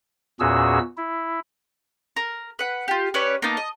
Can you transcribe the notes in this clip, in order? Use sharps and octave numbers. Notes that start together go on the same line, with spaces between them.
E2 A#2 C#4 F#4 G#4 E6
E4
A#4
B4 F#5
F4 G4
C#4 B4 C#5 D5
A#3 B3 D#4 A5
D#5